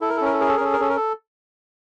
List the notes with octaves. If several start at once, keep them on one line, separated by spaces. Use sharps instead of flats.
E4 A4
A#4
A4
C#4 A#4
A4
G#4 A#4
A4
A#4
C#4 A4
A#4
C#4 A4
A#4
A4